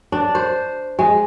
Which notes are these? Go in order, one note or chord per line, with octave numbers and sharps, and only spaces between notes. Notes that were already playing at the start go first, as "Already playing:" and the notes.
D4
C5
G#3